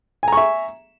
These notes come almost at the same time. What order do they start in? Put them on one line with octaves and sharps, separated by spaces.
G#5 A#5 C#6 E5